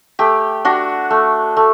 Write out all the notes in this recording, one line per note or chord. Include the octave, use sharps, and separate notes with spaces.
A3 G4
D4 F#4
A3
A3